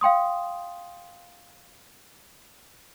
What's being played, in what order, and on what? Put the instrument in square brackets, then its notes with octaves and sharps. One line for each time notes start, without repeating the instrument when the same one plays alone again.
[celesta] F5 G5 C6 D#6